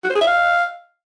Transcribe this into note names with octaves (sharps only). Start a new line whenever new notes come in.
F#4
C5
G#4
E5
F5